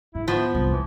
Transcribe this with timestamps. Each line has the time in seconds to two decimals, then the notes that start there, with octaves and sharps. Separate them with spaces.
0.15 G#2 E4
0.28 F3 B3
0.55 C2
0.72 E3 G#3